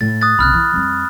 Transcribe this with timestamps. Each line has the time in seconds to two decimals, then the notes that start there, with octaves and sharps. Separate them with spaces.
0.01 A2 A6
0.22 D#6 F#6 A6
0.39 B1 C#3 B5 F6 F#6
0.53 E3
0.74 F2 G3